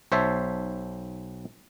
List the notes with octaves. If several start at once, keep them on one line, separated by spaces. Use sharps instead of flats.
B1 C5 C#5 E5 A5